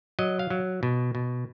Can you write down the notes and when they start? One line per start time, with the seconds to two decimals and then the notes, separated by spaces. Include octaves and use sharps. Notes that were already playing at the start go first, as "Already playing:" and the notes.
0.19 F#3 D#5
0.39 F5
0.50 F#3
0.83 B2
1.15 B2